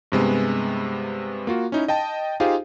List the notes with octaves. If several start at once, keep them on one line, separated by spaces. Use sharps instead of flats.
G2 C3 G#3 B3
A#3 F4 F#4
C#4 D#4 E4
D#5 G5 A5
D#4 F4 G4 G#4 C5 F5